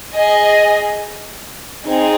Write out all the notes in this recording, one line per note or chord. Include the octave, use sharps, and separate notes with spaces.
G#4 D#5 G#5
C4 D#4 G#4